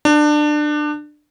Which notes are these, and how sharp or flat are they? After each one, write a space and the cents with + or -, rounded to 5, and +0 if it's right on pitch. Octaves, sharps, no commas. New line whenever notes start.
D4 +25